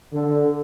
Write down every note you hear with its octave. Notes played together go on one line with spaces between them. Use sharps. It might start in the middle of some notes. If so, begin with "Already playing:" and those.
D3